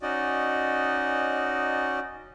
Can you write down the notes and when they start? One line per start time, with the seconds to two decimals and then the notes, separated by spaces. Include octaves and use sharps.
0.02 C#4 D#4 F#4 D5 D#5